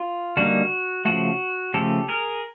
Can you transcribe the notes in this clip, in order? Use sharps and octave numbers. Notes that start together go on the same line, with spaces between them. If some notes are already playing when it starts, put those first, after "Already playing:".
Already playing: F4
D3 G3 A#3 D#4 F#4
C#3 F3 A3 F#4
C#3 F3 A3 G4 A4
G#4 A#4